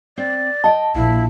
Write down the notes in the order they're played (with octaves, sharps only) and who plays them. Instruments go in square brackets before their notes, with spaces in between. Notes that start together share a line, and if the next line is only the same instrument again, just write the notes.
[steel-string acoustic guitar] C4 [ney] D5
[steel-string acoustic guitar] D#5 F#5 G5 [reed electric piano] A5
[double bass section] A#1 [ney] E4 [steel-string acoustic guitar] F5